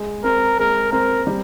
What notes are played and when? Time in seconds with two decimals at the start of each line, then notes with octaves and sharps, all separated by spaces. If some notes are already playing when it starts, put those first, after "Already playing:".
Already playing: G#3
0.24 C4 A#4
0.58 G#3 A#4
0.92 C4 A#4
1.27 G3